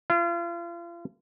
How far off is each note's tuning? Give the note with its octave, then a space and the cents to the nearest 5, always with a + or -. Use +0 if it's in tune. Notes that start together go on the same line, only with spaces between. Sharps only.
F4 -35